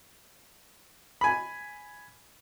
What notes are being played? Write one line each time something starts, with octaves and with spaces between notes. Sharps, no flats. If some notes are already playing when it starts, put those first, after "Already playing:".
G#5 B5